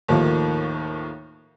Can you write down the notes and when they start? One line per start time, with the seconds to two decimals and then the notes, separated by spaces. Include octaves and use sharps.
0.08 D#2 A2 D#3 F3 A#3